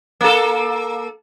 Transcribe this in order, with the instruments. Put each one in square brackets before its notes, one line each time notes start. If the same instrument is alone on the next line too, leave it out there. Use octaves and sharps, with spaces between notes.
[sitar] A#3 A4